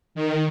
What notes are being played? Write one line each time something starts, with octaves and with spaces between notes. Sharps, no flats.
D#3